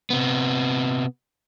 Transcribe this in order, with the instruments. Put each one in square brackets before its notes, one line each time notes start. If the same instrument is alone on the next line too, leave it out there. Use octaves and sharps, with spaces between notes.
[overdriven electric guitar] C3 B3